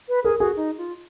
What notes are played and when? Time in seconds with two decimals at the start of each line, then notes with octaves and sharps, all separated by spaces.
0.09 B4
0.24 G#4 A#4
0.40 F#4 G#4
0.56 D#4
0.78 F4